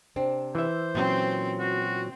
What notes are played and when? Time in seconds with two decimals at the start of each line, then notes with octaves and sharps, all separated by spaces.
0.16 C3 C4 D4
0.55 E3 C5 E5
0.95 A#2 F#3 C4 C#4
1.60 C4 F#4